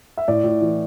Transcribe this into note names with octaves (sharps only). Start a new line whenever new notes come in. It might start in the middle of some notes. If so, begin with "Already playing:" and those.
E5
A2 D5
A2
E3